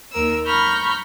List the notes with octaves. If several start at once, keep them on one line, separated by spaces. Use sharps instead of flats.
D#2 A#4 E6
A#5 B5 C#6 F6 G6